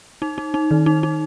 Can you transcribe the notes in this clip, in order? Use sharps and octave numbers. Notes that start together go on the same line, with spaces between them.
D#4
D#4
D#4
D#3
D#4
D#4